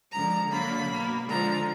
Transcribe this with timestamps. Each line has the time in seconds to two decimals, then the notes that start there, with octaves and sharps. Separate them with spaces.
0.11 D3 F3 G#3 A#5
0.50 D3 F#3 A#3 B5
0.89 B2 A#3
1.28 D3 F3 G#3 A#5